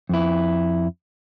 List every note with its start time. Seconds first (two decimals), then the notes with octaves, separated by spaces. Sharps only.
0.09 F2 E4